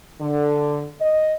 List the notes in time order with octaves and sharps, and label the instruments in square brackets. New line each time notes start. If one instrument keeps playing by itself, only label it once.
[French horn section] D3
D#5